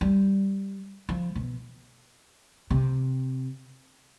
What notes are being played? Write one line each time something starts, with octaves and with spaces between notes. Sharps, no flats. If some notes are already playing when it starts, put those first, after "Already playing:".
G3
F3
B2
C3